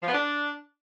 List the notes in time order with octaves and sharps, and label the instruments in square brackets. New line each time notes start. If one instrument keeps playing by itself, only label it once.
[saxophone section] F3
B3
D4